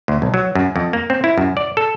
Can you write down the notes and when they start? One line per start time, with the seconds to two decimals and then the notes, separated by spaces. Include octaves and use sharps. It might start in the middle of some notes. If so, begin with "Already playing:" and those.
0.08 D2
0.22 B1
0.34 F#3
0.55 F#2
0.76 F2
0.93 A#3
1.10 C4
1.24 E4
1.38 F#2
1.57 D5
1.77 A4